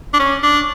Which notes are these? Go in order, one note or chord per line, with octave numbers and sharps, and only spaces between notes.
D4
C#4
D4